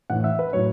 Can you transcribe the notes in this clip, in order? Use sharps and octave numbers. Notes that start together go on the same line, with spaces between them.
A2 E3 F#5
E5
B4
A2 F#3 C#5